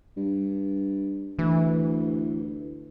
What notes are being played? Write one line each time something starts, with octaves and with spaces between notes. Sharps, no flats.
G2
D2 E3